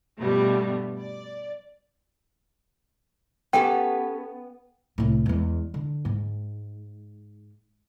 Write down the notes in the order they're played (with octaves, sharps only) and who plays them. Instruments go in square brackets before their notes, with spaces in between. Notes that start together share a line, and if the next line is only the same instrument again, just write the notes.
[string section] G2 B2 F3 G3 A3 B3
D5
[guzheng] B3 [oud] C#4 G4 A4 [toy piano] G5 G#5
[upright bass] C2 A2
E2 G#3
D3
G#2